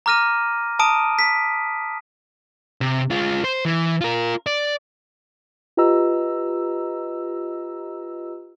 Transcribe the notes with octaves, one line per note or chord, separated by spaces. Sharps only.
A#5 D6 F6 A#6 D#7
A5 A#5 D#6 D7 D#7
B6
C3
G#3 F4
C5
E3
F4 A#4
D5
F4 G4 B4 D#5 A#5 E6